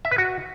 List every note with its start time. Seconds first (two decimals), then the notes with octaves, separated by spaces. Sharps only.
0.05 E5
0.11 B4
0.18 F#4